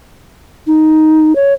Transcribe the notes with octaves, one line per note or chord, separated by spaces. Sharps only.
D#4
C#5